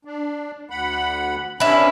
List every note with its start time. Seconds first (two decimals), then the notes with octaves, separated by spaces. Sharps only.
0.05 D4
0.70 D2 F#5 B5
1.60 C3 C#4 D4 E4 B4